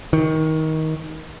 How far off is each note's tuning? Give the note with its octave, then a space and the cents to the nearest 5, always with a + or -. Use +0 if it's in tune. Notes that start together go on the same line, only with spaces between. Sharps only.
D#3 +20